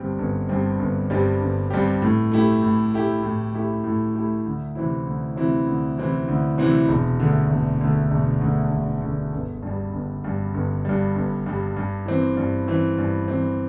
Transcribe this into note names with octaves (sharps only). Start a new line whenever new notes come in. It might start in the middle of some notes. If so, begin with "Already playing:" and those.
Already playing: G1 G2 G3 C4 G4
G1
G2 G3 C4 G4
G1
G2 G3 C4 G4
G1
G2 G3 C4 G4
A2
A3 E4 G4
A2
A3 E4 G4
A2
A3 E4 G4
A2
A3 E4 G4
D2
C3 E3 C4 E4
D2
C3 E3 C4 E4
D2
C3 E3 C4 E4
D2
C3 E3 C4 E4
E1
D2 D3
E1
D2 D3
E1
D2 D3
E1
D2 D3
G1
G2 G3
G1
G2 G3
G1
G2 G3
G1
G2 G3
G2
E3 C4
G2
E3 C4
G2
E3 C4